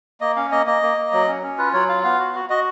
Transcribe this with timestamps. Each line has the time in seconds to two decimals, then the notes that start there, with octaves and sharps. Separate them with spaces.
0.21 A#3 D#5
0.36 C#4 F5
0.51 A#3 D#5
0.67 A#3 D#5
0.82 A#3
0.97 A#3
1.13 F#3
1.28 C#4
1.43 C#4
1.58 F4 B4
1.73 F#3 C#5
1.89 F4 F5
2.04 B3 F5
2.19 F#4
2.35 F#4
2.50 F#4 D#5